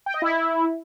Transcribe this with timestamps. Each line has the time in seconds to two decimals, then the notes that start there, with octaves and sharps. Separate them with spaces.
0.06 G5
0.14 D#5
0.22 E4